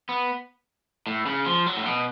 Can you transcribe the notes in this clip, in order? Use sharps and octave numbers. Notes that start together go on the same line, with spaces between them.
B3
A2
C#3
F3
F#3
A2
B2